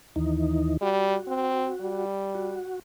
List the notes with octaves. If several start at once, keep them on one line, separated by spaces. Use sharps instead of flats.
D#2 E3 D#4
G3 F#4
C4
G3
F#4